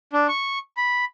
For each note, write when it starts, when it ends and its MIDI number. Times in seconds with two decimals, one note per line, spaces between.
0.13 0.27 62
0.29 0.59 85
0.77 1.05 83